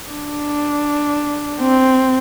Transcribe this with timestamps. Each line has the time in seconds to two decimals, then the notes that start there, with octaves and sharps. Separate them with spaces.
0.10 D4
1.61 C4